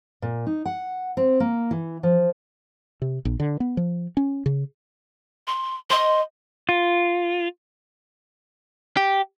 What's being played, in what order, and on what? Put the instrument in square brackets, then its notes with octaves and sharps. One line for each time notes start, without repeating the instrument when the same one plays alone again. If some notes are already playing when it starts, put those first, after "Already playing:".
[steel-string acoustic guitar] A#2
D#4
F#5
C4
A#3
E3
F3
[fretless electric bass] C3
A#1
D3
B3
F3
C#4
C#3
[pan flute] C6
[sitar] C5 D#5 [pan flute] C6
[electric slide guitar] F4
[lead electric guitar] G4